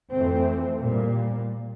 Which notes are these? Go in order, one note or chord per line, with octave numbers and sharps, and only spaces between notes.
F2 E3 A3 C4
A#2 G3 A#3